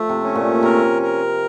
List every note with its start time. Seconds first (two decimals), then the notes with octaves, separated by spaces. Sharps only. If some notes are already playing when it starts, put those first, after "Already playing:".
Already playing: F3 A3
0.09 C3
0.23 C#4
0.36 A#2
0.63 C3 A#4
1.02 A#4